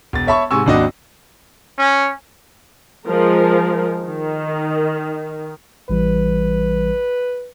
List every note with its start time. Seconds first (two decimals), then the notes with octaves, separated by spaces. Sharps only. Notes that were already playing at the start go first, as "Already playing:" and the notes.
0.13 E1 A6
0.27 C#5 E5 A5 B5 C#6
0.51 G#2 C3 G#5 C#6 E6
0.66 G#1 D#2 D4 F#4 D#5
1.78 C#4
3.08 F3 G#3 A#4
4.02 D#3
5.90 A1 E3 G3 B4